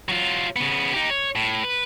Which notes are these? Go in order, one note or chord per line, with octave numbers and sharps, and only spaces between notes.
F#3 F4
C#3 B3
D#4 G4
C#5
A2
B4